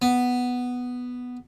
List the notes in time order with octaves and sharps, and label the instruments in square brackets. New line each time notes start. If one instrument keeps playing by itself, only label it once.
[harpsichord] B3